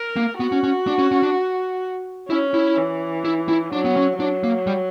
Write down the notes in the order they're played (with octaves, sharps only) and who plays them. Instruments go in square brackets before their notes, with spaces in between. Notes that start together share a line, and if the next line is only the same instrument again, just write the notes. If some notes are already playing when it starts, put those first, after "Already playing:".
Already playing: [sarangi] A#4
[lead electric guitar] A#3
[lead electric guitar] B3 [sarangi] F#4
[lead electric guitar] C#4
C#4
D4
C#4
C#4
D4
[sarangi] C#4 [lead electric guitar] E4
[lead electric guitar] E4
[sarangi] E3
[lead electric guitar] E4
E4
[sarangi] F#3 [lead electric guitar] D4
[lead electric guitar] B3
C#4
[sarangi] F#3 [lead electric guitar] D4
[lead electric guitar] A#3
G3